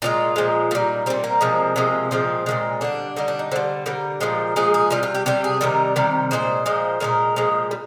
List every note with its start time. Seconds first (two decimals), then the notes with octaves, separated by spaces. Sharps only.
0.02 A#2 F3 G#3 F4
0.36 A#2 F3 G#3
0.71 A#2 G3 D#4
1.06 A#2 G3 C4
1.24 A#3
1.41 C3 F3 G#3
1.76 C3 F3 G#3
2.11 A#2 F3 G#3 C4
2.46 A#2 F3 G#3
2.81 D3 G3 D4
3.16 D3 G3 D#4
3.28 D4
3.39 D#4
3.51 D3 G3 C5
3.86 D3 G3 A#4
4.20 A#2 F3 G#3
4.56 A#2 F3 G#3 G#4
4.74 G#4
4.90 C3 G3 F4
5.03 F4
5.15 G4
5.26 C3 G3 G4
5.44 G#4
5.61 C3 D#3 G3 A#4
5.96 C3 D#3 G3
6.31 A#2 F3 G#3 C5
6.66 A#2 F3 G#3
7.00 A#2 F3 G#3 A#4
7.36 A#2 F3 G#3
7.71 G3